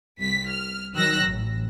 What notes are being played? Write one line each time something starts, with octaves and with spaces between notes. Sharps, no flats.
C2 B6
F6
D#3 F#3 E6 F#6 A#6
A1